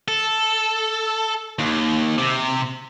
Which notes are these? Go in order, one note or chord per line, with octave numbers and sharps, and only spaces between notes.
A4
D#2
C3